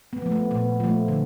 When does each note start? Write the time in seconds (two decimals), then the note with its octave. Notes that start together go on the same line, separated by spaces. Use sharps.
0.13 B3
0.22 F3 A3
0.32 B3
0.51 A#2 B3
0.80 F3 A3
1.08 D3